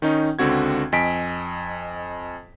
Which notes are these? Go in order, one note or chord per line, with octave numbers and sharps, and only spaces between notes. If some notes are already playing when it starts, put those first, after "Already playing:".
D#3 C#4 D#4
C#2 D3 C4 F#4 G#6
F2 D#5 G#5 B6 D7